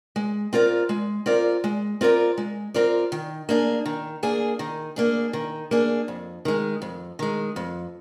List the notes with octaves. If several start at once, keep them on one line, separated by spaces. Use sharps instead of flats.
G#3
C4 F4 A#4 D5
G#3
C4 F4 A#4 D5
G#3
C4 F4 A#4 D5
G#3
C4 F4 A#4 D5
D#3
A#3 D4 G#4
D#3
A#3 D4 G#4
D#3
A#3 D4 G#4
D#3
A#3 D4 G#4
F2
D#3 G#3
F2
D#3 G#3
F2